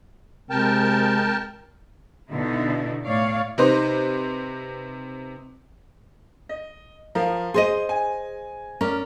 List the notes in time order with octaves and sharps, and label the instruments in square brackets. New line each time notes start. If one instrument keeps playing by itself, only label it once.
[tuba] C3 [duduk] G#3 [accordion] A#4 G5 A5
[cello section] B2 D3 D#4 E4
A2 C#5 D5 F5
[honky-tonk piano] C3 D#4 B4 C5
[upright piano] D#5
F3 A#4 F5
[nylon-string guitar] G#4 C5 D#5 [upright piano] C6 A#6 D#7
[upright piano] G#5
[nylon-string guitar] C#4 D5 [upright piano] A#4